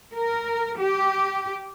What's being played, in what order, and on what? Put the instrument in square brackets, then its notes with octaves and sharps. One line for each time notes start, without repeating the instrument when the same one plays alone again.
[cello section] A#4
G4